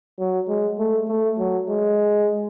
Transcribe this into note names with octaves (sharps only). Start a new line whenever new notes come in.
F#3
G#3
A3
A3
F#3
G#3